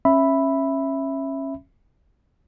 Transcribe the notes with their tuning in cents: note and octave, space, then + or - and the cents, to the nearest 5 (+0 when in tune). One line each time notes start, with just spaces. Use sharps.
C#4 -25 E5 +0 B5 +0